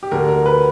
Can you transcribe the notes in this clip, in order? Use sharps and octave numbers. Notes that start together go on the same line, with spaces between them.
G4
D2 D3 A#4
A#4
B4